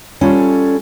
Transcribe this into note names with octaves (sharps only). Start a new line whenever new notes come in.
G3 C#4 F4 A4 D5